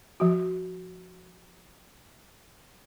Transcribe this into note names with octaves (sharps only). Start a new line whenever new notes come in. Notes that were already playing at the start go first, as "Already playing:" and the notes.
F3 F#4